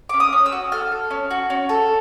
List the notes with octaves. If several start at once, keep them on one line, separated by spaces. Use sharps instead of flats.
C#4 D6
D#6
C#4
E6
F#4
A4 F6
A4
C#4
F#4
C#4
A4